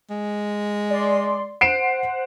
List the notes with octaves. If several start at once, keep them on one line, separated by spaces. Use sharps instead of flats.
G#3
D5 C6
C5 F#5 C7 D7 E7